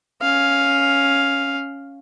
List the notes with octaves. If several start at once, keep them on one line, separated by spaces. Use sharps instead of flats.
C#4 F5